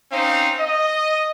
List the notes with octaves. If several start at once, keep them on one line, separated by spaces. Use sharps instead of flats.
C4 C#4 D#4 C5 F5
D#5